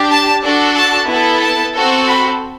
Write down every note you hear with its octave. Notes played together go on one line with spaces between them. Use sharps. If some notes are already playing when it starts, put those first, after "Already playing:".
Already playing: D4 G4
A5
D4 F#4 A4
A5
B3 E4 A4
A5
C4 F#4 A4
B5